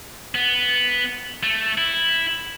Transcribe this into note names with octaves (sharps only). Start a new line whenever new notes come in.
B3
A3
E4